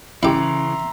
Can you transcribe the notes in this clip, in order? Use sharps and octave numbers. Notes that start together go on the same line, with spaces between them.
C#3 E3 C#4 E4 G4 E5 A#5 C6